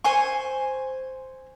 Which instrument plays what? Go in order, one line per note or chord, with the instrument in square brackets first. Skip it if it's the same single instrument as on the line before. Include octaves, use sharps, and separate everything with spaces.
[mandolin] C5 G#5 C#6